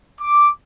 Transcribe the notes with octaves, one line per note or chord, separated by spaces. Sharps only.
D6